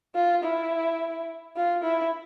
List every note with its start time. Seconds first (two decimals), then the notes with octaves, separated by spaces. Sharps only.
0.15 F4
0.44 E4
1.56 F4
1.84 E4